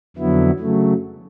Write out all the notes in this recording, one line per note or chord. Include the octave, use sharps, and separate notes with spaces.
F2 D3 F#3 B3 E4
C#3 F#3 A3